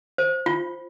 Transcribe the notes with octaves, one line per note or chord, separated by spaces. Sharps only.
C5
F4